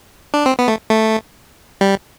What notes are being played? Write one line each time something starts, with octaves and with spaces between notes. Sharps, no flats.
D4
C4
B3
A3
A3
G3